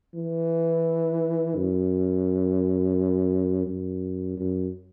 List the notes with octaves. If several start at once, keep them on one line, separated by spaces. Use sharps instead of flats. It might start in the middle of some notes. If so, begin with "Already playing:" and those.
E3
F#2
F#2
F#2